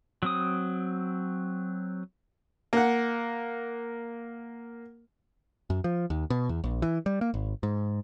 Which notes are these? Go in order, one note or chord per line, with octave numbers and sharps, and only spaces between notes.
F#3 C4 D#6
A#3 F#5
F#2
F3
D#2
B2
E2
A#1
E3
G3
A#3
G#1
G#2